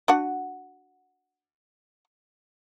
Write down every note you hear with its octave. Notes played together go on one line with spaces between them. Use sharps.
D4 F#4 F#5